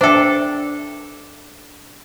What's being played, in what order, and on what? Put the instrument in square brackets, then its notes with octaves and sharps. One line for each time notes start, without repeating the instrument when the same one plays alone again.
[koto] D4 A4 [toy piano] C5 E5 G5